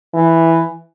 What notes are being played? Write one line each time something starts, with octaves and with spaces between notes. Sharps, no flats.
E3